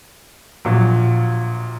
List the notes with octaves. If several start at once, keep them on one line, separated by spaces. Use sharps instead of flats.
A#1 A#2 F#3